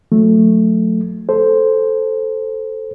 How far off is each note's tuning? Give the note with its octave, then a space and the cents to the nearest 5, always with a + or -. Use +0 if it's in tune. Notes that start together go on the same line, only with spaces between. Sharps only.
F#3 -45 A3 +0
A4 +0 C5 +0